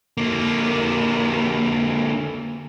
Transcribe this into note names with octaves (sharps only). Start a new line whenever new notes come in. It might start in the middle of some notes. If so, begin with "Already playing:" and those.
D3 A#3